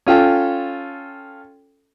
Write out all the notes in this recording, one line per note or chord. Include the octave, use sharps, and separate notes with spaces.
C#4 F4 A4 G5